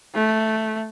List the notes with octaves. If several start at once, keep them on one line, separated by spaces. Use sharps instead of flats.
A3